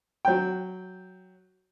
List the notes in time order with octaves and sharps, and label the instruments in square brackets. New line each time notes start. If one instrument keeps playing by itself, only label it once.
[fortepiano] F#3 G5